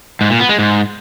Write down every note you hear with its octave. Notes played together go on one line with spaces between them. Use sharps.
G#2
A#2
B3
G#3
G#2